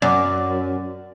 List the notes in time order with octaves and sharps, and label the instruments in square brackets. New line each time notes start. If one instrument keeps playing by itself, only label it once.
[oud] F#2 [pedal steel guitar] D5 D6